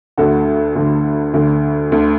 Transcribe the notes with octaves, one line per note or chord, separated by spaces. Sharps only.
D2 D3 F#4 A4
D2 D3
D2 D3
D2 D3